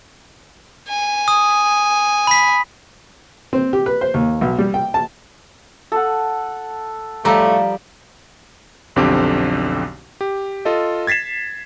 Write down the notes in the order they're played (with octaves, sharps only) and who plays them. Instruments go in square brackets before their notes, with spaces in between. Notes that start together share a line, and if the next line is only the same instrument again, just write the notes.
[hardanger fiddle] G#5
[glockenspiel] D#6
B5 B6
[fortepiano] C4
G4
B4
C5
D#2
B1
G3
G5
A5
[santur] A4 F#5
[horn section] A2 A3 [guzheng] F3 G3 [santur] D5 F5 B5 [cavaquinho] A#5
[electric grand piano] B1 F2 D3 C4 G4 D6
G4
F4 A4 D#5
G#6 A6 B6 C7 E7